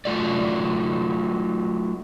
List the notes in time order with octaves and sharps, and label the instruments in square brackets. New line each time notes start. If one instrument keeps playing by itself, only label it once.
[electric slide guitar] F#3 A3 F4 A4 D5